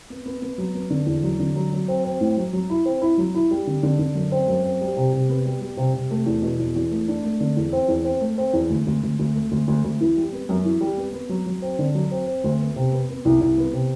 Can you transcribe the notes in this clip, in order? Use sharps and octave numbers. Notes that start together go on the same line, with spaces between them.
B3
B3
B3
F#3
B3
D3
E2
F#3
D3
F#3
F#3
C4
C4
A2
F#3
F#3
E4
C4
E4
F#3
E4
G3
D3
D3
D3
F#2
C4
F#2
C4
G3
C3
C3
B3
G3
G3
C3
C3
A3
E2
B2
E2
E2
A3
D4
A3
D3
E2
C4
E2
C4
A3
C4
E2
D2
D2
D2
D2
A3
D2
D2
D2
E3
G3
B3
F#2
E3
G3
B3
B3
F#3
F#3
C4
D3
F#3
C4
C4
D2
B3
C3
B3
B3
C2
C2
B3
C3